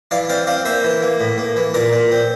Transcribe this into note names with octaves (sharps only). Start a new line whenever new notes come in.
E3 D5 F5
C4 D5 F5
C4 D5 F5
A#3 C5 E5
E3
A#3
A2
A#3
E3
A#2 A#4 D5
A#2
C4